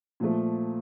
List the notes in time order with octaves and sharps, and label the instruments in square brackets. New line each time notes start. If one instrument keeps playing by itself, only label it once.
[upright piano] A#2 F3 A3